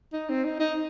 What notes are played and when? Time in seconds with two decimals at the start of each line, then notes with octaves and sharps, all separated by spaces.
0.13 D#4
0.29 C4
0.44 D#4
0.60 D#4